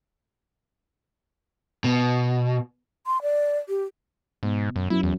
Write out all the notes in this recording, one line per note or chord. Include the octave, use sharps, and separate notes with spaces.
B2
C6
D5
G4
G#2 B2
F#2
F#2 F#3 E4
E2